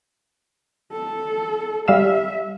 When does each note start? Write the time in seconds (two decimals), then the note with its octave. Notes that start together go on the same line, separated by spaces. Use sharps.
0.92 A4
1.88 G3 E5 F5 E6